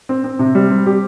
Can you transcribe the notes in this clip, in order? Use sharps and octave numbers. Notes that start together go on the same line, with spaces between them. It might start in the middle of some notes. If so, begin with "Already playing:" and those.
C4
C4
C3
G3
C4
G4